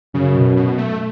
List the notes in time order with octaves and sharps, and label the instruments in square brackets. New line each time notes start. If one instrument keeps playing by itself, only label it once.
[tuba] F#2 [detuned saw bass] C#3
[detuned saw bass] B2
B2
A3